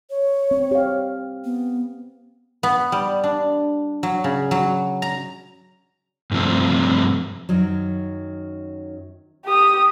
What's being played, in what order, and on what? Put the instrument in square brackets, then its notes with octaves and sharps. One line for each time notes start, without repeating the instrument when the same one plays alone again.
[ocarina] C#5
[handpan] C4
G4 F5
[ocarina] B3
[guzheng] B3
G3
D4
F#3
C#3
F#3
A#5
[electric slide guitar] G2 C3 F3 A3 C4
[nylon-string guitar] F#2 D#3 F#3
[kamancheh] G4 D#6